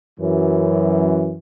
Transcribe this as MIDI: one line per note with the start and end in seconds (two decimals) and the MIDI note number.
0.19 1.37 42
0.19 1.37 52